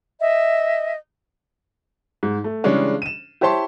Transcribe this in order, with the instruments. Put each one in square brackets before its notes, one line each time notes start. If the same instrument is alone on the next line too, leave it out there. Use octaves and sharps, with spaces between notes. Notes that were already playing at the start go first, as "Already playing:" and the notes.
[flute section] D#5 E5
[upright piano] G#2
A3
C#3 E3 G3 G#3 C#4 D4
D#7 E7
E4 G4 C5 C#5 A5 C6